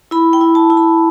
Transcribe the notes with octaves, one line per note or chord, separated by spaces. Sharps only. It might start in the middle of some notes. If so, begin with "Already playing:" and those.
E4 B5
G5
E4
A5
E4
B5